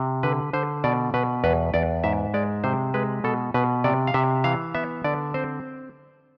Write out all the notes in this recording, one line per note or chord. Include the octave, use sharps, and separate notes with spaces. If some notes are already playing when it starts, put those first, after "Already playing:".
Already playing: C3
D3 B4
D3 C5
B2 D5
B2 B4
E2 B4
E2 D5
G#2 E5
G#3 D5
C3 C5
G#3 B4
B2 A4
B2 B4
C3 D5
F5
C3 E5
E3 F5
B3 E5
D3 D5
C4 C5